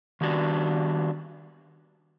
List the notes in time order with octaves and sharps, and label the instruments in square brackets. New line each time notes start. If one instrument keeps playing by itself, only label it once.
[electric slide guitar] D#3 G3 B3 D4 F#4